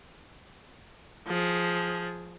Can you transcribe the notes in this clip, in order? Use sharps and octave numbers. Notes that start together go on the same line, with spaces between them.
F3 G#4